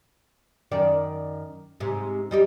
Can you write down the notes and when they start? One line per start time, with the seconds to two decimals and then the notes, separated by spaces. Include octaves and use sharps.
0.71 F#2 D#3 D5
1.80 G#2 C3
2.31 G3 D#4 G4